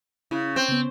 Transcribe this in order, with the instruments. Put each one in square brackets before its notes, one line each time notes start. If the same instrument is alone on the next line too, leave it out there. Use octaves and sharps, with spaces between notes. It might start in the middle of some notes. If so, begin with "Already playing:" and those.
[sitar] C#3 [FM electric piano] E4 F#6
[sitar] C4
[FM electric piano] C#3 B3